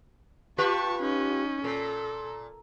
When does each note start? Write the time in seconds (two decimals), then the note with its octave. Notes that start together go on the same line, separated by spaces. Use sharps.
0.58 F4 G4 B4 A5 C#6
1.01 C#4 D#4
1.64 A#2 A4